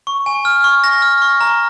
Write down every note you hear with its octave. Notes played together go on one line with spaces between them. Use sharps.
C#6
G#5
F6
C#6
A#6
F6
C#6
A#5